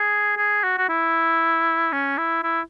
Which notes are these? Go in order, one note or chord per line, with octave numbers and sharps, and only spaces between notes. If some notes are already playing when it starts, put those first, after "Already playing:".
Already playing: G#4
G#4
F#4
F#4
E4
C#4
E4
E4